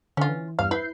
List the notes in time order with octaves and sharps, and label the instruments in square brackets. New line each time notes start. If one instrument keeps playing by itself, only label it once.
[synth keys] D3 [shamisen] C#4 F4
[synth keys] E3
[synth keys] E2 G2 F6 [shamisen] F5
[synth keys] E4 G6 C7 [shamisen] B4